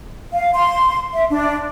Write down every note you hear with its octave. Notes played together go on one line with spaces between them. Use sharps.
F5
C6
E5
D4